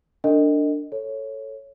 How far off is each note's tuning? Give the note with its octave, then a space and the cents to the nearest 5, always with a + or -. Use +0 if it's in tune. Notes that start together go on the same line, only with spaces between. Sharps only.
D4 +0 A#4 -45 D#5 +5
A4 +0 C#5 -5